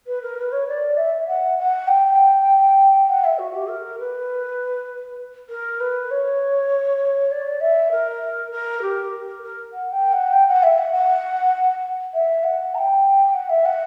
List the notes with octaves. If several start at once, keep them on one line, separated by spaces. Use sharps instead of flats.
B4
A#4
B4
C#5
D5
E5
F#5
F#5
G5
F#5
E5
F#4
G4
A#4
B4
A#4
B4
C#5
D5
E5
A#4
A#4
G4
A#4
A#4
F#5
G5
F#5
G5
F#5
E5
F#5
F#5
E5
F#5
A#5
G5
F#5
E5
F#5